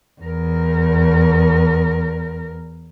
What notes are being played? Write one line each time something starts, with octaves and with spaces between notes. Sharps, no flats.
E2 A#4